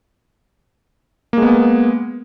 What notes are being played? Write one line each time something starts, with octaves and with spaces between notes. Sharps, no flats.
G#3 A#3 B3